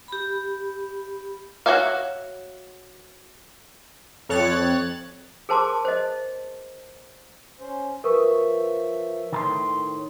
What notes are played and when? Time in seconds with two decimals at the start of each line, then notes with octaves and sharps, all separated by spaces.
0.08 G4 B5
1.66 F#4 A4 C#5 E5 F5
4.29 F2 C#5 F#6 A6
5.49 G#4 A#4 C5 A5 C6 D6
5.85 C5 D#5
7.60 C#4 C5
8.04 F3 A#4 B4 E5 C#6
9.32 A2 D#3 A#5 C6